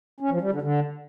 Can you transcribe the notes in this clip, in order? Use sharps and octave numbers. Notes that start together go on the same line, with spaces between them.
C#4
F3
G3
D3
D3